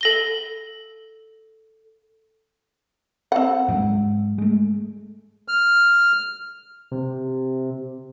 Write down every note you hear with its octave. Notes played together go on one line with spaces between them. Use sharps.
A4 A#6 G7
C4 F#5
G#2 F#3 G#3
G#3 A3
F6
C3